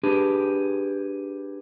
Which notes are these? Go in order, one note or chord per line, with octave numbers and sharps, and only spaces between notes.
D4 G4 G#4 B4